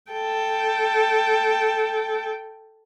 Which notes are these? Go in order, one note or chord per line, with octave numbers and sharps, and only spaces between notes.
A4 G5